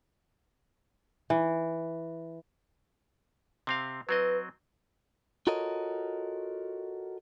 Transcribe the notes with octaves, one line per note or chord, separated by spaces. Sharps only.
E3
C3 C4 F5
F#3 C4 B4 D#5
F4 F#4 A4 A#4 C#5 D#5